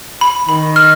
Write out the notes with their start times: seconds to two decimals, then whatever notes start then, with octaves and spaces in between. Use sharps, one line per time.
0.21 B5
0.48 D#3 B5
0.76 F6